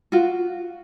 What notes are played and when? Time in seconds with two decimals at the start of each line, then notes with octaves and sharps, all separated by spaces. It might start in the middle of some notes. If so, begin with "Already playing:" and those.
0.12 F4 F#4